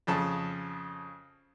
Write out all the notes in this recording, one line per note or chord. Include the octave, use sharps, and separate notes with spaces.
F2 C#3 A5